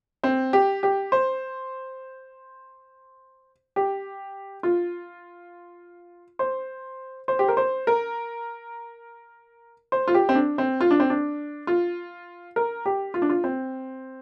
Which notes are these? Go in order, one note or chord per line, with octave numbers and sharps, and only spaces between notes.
C4
G4
G4
C5
G4
F4
C5
C5
G4
A#4
C5
A#4
C5
F4
G4
C4
D4
C4
F4
D4
C4
D4
F4
A#4
G4
F4
D4
F4
C4